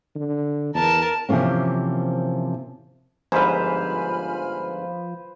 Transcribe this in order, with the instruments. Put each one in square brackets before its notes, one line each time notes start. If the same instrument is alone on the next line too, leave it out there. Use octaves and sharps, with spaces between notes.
[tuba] D3
[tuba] E2 [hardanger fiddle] A#4 A5
[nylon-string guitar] C3 E3 F3 A#3 C#4
[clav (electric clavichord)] G1 G#2 [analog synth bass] F3 [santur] B4 C5 [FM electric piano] G#5 B5 F6